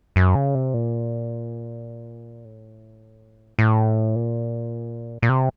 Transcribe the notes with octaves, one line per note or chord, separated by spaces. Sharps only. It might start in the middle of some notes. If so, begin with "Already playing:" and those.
F#2
C#3
C3
A#2
A2
A2
A#2
A#2
C3